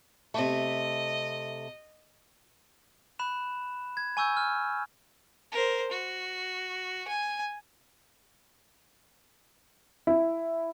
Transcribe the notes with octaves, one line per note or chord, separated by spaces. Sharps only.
C3 A3 D#5
B5 F#6 E7
G#6
G#5 C#6 E6 G6
F6
A#4 C5
F#4
G#5
E4